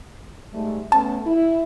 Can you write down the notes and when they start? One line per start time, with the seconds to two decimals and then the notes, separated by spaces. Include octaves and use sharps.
0.53 G#2 G3 A3
0.92 A3 B3 C#4 A5
1.26 E4